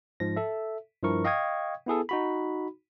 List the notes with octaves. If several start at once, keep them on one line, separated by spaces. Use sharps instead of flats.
G#2 F3 A#6
A4 E5
G2 F3 E4 A#4 C#6
D#5 F5 G5 C#6 D#6 G#6
B3 E4 G#4 A4
D#4 F#4 B5